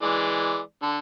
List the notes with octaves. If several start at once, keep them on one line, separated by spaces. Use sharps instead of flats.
E3 G#3 D5
D3 A4